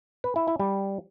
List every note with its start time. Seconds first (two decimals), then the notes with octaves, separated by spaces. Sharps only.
0.24 B4
0.36 E4
0.48 E4
0.60 G3